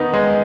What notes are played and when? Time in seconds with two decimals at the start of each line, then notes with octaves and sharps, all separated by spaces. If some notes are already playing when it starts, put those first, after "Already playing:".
Already playing: D#3 B3 D#4
0.13 G#3